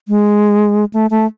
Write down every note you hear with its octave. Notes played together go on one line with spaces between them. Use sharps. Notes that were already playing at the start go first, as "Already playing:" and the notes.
G#3
A3
A3